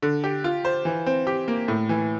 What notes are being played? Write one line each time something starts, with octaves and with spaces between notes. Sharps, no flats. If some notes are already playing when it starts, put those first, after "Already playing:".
D3
G4
F4
C5
E3
C4
G4
A#3
A2
E3